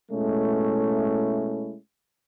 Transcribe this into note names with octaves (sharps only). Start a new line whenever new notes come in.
B2 G#3 A3 C#4 E4